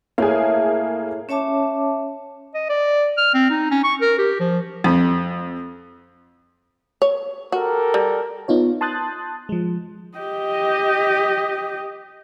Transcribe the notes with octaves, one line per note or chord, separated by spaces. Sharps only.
A2 A#3 G#4
C#4 C#5 E5 A5 D6
D#5
D5
F6
C4
D#4
C#4
C#6
A#4
G4
F3
F2
C#5
F#4 G4 A4 A#4
G3
B3 D#4 F4 C#5
A5 C6 D#6 F#6 G6 A6
F3 G#3
G4 D#5